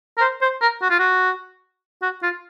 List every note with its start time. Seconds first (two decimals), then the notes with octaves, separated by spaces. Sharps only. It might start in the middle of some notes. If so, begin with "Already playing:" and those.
0.18 A#4
0.21 C5
0.42 C5
0.62 A#4
0.82 F#4
0.90 F4
0.99 F#4
2.02 F#4
2.23 F4